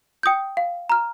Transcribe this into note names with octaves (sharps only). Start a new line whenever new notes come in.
G5 D#6 G6
F5
A#5 F6